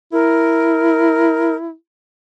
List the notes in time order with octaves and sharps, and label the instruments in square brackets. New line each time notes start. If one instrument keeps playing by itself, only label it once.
[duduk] E4 [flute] A#4